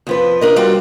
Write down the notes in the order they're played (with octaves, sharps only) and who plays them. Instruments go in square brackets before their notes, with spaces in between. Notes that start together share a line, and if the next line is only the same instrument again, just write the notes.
[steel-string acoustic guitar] F2 F3 B4
D4 A#4 D#5
G3 F4 F#4